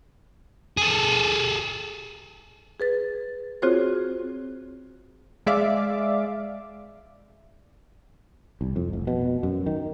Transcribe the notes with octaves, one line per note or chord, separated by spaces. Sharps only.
G#4 A4
G#4 B4 A6
C4 F4 F#4 G#4 C5 C#5
G#3 D5 E5 F5 D6
C2
F2
F1
B2
F#2
D#3